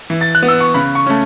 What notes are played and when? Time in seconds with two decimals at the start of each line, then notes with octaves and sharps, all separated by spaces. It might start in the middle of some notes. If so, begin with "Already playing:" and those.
0.10 E3
0.21 A6
0.35 F#6
0.42 B3
0.48 E6
0.60 C#6
0.74 C#3 B5
0.95 C#6
1.06 A3 C#4